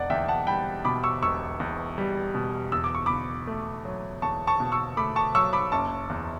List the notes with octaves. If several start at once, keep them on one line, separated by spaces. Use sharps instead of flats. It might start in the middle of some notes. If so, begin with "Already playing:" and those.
Already playing: E1 D5 F#5
E2 E5 G5
F#5 A5
G3 G5 B5
B2 B5 D6
C#6 E6
E1 C#6 E6
E2
G3
B2
E2 E6
D6
C#6
B2 B5 D6
A3
F#3
E2 A5 C#6
A5 C#6
B2
C#6 E6
A3 B5 D6
A5 C#6
F#3 C#6 E6
B5 D6
F#1 A5 C#6
E2